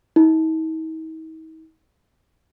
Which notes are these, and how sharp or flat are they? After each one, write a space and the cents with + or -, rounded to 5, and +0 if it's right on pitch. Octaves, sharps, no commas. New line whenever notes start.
D#4 +45